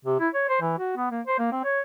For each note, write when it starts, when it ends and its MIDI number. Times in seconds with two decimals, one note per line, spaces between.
0.05 0.20 48
0.20 0.29 64
0.34 0.45 73
0.49 0.57 72
0.61 0.75 52
0.78 0.92 66
0.97 1.08 59
1.11 1.21 58
1.27 1.38 72
1.39 1.52 58
1.52 1.60 60
1.64 1.81 73